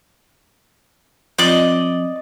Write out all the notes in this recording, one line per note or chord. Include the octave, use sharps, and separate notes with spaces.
F3 C4 D5 D#5